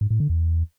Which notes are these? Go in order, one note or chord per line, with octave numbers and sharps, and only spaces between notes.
G#2
A2
D3
E2